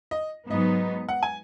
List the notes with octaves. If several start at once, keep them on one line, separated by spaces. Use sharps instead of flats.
D#5
G#2 F#3 B3 D#4 D#5
F#5
G#5